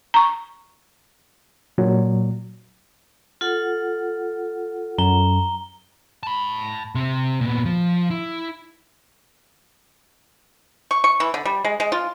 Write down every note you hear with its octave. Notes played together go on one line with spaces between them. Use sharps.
A#5 C#6
A#2 F#3
F4 A4 F#5
F#2 A#5 G7
A5 B5
C3 C4
A#2 B3
F3
E4
C#6
C#6
E3
D3
G3
G#3
G#3
F4